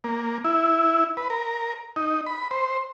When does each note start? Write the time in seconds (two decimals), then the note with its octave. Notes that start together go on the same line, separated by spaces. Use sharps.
0.04 A#3
0.44 E4
1.17 B4
1.30 A#4
1.96 D#4
2.27 B5
2.51 C5